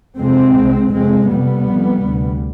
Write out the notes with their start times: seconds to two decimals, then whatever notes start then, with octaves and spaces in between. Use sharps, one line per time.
0.17 F2 C3 G#3 C4
0.55 C2 C3
0.93 F2 C3 G#3 C4
1.29 F2 C3 G3 B3
1.67 F2 C3
2.05 D2 C3